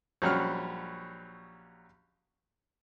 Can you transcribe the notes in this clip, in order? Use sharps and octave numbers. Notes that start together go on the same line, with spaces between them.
A#1 F#3 G3 C#4 F#5 F6